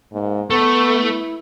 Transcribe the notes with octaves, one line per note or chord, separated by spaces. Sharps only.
G#2 A#3
A3 B3 C#6
E4